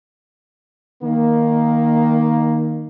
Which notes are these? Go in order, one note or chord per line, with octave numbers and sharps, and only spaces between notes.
D#3 A#3